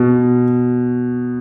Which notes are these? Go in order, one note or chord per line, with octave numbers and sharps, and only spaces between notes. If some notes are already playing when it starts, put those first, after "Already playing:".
Already playing: B2